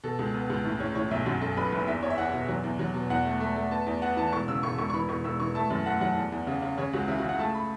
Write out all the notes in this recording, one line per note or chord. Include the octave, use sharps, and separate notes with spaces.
B2 A4
C#2
B3
C#2
A2
A2 C#5
A2 C#5
B1 E5
F#2 F#4
F#2 A4
F#2 B4
F#1 B4
E2 E5
E2 C#5
E5
E2 F#5
B2
F#3
E2
F#3
B2
E2 F#5
A3
A3
A3
B3 A5
E2
B3 F#5
E3 A5
E1 C#6
C#3 E6
E1 C#6
E1 C#6
C#6
E3 B5
E1 C#6
E1 E6
E3 C#6
A3 A5
F#2
A3 F#5
F#3 F#5
E2
E2
C#3
C#3
C#3 C#5
C#2 F#4
C#3 E4
F#4
C#3
F#5
A3 A5
B5